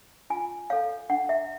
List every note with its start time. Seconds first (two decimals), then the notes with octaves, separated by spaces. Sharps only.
0.30 F4 G#5
0.70 A4 C#5 F5
1.10 D4 F#5
1.29 E5